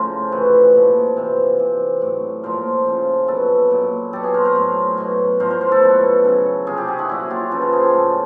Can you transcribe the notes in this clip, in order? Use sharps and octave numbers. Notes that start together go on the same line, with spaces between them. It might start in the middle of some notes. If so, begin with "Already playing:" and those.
Already playing: A2 C#3 F3 A#4 C5
C3 E3 B4 C#5
A#2 F3
C3 E3
C3 E3
A2 F#3
A#2 F3 A#4 C5
C#3 F3
B2 F#3 A4 B4
A#2 F#3
B2 F#3 G4 A4
F#4 G#4
A#4 C5
A#4 C5
A2 F#3
B2 F#3
A2 F3 A#4 C5
A#4 C5
A#4 C5
A4 B4
B2 F#3
C#3 F#3
C3 F3 G#4 A#4
G4 A4
F#4 G#4
E4 F#4
A#2 F#3 E4 F#4
F4 G4
C#3 F3 A4 B4
A#4 C5
G#4 A#4
G4 A4
A2 F#3